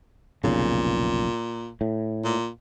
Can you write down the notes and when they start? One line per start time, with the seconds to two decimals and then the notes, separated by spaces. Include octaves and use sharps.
0.44 F1 B1 A#2 C#3
1.81 A2
2.24 A#2